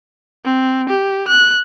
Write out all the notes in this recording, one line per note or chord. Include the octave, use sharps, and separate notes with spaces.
C4
G4
F#6